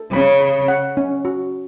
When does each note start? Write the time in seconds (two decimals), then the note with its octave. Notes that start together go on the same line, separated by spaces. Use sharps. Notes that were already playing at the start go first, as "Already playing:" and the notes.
Already playing: A4
0.12 C#3 B5
0.41 B5
0.68 F#5
0.97 C#4
1.25 F#4